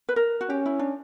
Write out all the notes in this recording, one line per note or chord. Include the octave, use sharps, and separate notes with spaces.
B4
A#4
F#4
C#4 G4
E4
D4